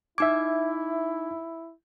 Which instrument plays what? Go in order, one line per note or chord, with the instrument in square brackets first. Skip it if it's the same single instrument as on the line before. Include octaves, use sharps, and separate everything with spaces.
[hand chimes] D#4 G#6 [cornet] E4 [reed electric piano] E5 D6